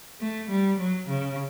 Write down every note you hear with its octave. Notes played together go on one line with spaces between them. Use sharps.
A3
G3
F#3
C#3